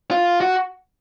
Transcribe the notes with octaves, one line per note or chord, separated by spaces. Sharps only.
F4
F#4